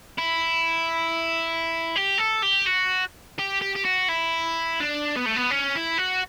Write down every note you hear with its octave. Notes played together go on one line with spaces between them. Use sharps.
E4
G4
A4
G4
F#4
G4
G4
G4
F#4
E4
D4
B3
A3
B3
C#4
E4
F#4